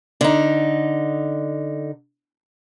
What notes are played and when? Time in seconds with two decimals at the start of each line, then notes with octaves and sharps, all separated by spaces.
0.21 D3 D#4